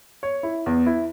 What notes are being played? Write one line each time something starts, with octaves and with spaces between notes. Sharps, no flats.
C#5
E4
E2
E4